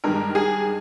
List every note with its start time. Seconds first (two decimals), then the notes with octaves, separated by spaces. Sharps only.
0.04 G2 D#3 G#3 A#4
0.35 G#4